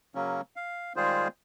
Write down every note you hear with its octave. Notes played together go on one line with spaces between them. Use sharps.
C#3 F#3 A#3 C#4
F5
D#3 G3 G#3 F4 G#4 C5